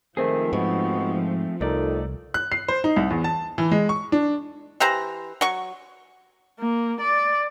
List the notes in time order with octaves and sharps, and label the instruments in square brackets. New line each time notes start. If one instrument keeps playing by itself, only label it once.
[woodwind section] G#2 C3 D#3 [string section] F3 [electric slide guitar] A3 C4 G#4
[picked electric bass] G#2 [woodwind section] B3 D#4 F#4
[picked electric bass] C2 [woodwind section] F2 D#3 D#4 [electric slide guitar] A3 D5
[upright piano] F#6
C7
C5
D#4
C2
E2
A5
E3
G#3
C#6
D4
[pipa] E3 G4 C5 A#5
F#3 C#6
[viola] A#3
D5